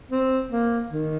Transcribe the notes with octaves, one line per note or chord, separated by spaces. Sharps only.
C4
A#3
D#3